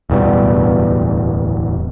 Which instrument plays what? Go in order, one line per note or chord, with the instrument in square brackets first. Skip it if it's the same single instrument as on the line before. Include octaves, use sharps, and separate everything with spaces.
[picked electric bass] D1 E2 B2 G3